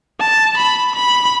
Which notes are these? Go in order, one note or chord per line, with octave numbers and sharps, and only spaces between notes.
A5
B5
B5